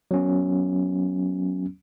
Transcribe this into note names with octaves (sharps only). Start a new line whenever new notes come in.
F#3 B3 C#4